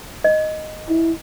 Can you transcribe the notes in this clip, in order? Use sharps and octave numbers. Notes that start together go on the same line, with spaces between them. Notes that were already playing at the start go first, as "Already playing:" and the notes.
D#5
E4